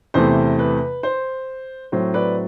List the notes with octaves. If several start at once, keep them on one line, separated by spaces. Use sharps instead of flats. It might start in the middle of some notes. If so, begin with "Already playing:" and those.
E2 C3 E3 A3 C5
B4
C5
A2 F#3 C4 C5
B4 D5